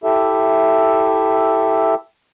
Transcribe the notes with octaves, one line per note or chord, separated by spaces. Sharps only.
E4 G4 A4 E5